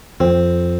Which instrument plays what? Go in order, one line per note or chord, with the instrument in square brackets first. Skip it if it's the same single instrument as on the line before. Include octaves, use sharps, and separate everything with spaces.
[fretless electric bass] F2 [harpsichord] C4